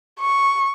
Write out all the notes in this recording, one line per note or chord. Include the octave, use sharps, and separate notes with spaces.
C#6